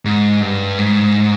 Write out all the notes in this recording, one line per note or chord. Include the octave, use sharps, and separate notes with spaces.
G#2
G2
G#2